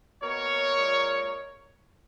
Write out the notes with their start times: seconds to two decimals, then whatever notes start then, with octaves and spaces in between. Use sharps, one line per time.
0.23 B2 A#3 D#4 A#4 C#5
0.77 A#2 G#3 D#4